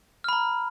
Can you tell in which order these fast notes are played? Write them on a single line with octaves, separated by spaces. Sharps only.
F6 B5 A#5